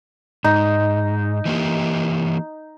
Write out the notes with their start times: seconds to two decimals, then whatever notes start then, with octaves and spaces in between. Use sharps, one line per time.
0.44 G#2 D#4
1.45 E3 A#3 G4